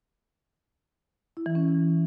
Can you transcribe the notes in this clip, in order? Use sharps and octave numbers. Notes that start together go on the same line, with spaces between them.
E4
E3
C#4